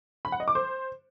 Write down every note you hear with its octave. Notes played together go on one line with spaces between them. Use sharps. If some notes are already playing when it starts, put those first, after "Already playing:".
B5
F#5
D#5
D6
C5